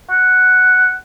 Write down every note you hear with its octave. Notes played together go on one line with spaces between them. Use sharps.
F#5